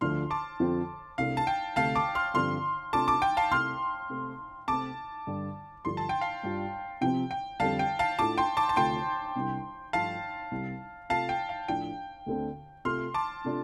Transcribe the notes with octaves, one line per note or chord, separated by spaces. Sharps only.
D2 D3 F3 D4 F4 C6 F6
A5 D6
F2 D3 F3 C4 F4
C2 C3 A3 D4 F5
A5
G5
D2 C3 A3 F5 A5
A5 D6
C6 F6
G2 D3 F3 C4 F4 C6 F6
C3 A3 D4 F4 A5 D6
A5 D6
G5
F5 A5
C2 C3 A3 C6 F6
C3 A3 C4
C3 A3 C4 A5 D6
G2 D3 G3
G2 D3 F3 D4 C6
A5
G5
F5 A5
G2 G3 F4
C3 F3 C4 G5
G5
F2 D3 G3 F5 A5
G5
F5 A5
A2 A3 D4 F4 A5 D6
G5 C6
A5 D6
A5
D2 C3 A3 F4 G5 C6
C2 C3 G3 D4
G2 F3 A3 F5 A5
C2 C3 G3
C3 A3 F4 F5 A5
G5
F5
A2 F3 D4 F4 G5
D2 D3 A3 C4
C3 A3 F4 C6 F6
A5 D6
C3 A3 D4 F4